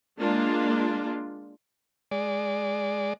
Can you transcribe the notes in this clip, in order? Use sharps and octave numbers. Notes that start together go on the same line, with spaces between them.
G#3 A#3 D4 F4
G#3 D5